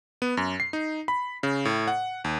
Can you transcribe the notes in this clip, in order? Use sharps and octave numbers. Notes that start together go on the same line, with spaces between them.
B3
F#2
C7
D#4
B5
C#3
A2
F#5
D#2